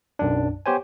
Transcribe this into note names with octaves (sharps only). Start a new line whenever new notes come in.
B1 F#2 D4
B3 G4 C5 C#5 G#5